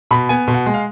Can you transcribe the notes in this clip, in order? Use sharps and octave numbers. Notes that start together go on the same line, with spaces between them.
B2 B5
B3 G#5
B2
F#5
G#3
F5